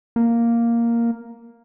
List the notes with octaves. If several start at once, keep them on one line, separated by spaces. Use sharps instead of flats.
A#3